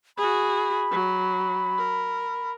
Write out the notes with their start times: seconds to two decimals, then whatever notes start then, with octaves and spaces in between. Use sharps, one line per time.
0.17 F#4 G#4 B5
0.91 F#3
1.78 A#4